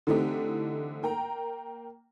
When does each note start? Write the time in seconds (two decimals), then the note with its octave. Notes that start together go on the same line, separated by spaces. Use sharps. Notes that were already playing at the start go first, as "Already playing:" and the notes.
0.07 D3 E3 A3 C4 D#4 G4
1.03 A#3 G5 A#5